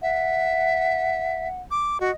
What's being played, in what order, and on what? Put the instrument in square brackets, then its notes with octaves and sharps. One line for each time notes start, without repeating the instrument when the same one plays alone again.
[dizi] E5 [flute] F#5
[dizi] D6
[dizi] F#4 [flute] D#5